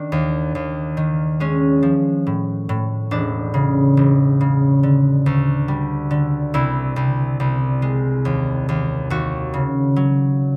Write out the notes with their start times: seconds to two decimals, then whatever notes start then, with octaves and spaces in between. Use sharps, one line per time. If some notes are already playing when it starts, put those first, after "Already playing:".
Already playing: D#3 D4
0.12 D#2
0.55 D#2
0.97 D#3
1.40 G#3 C#4
1.83 F3
2.27 A2
2.69 A2
3.11 E1 D4
3.54 C#3
3.97 E1
4.41 C#3
4.83 D3
5.26 D2
5.68 G3
6.11 D3
6.54 C2 E4
6.96 C2
7.40 C2
7.82 G#3
8.25 D#2
8.69 D#2
9.10 D#2 F#4
9.54 C#3
9.96 F#3